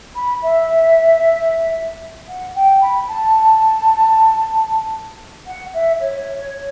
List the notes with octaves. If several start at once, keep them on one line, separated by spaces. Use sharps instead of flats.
B5
E5
F#5
G5
B5
A5
F#5
E5
C#5